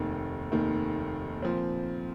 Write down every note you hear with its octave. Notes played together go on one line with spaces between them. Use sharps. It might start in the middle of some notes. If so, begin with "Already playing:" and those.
Already playing: F1 D#2 D#3
F1 D#2 D#3
A#2 F3 C4